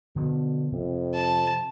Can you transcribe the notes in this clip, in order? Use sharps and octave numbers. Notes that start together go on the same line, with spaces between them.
B2 D3 F3 B3
F2 C3
A5